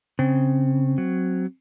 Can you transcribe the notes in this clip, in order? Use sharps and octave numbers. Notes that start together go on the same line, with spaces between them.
C#3 C4
F#3